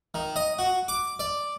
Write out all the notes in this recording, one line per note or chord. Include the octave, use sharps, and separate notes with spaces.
D#3
D#5
F#4
D6
D5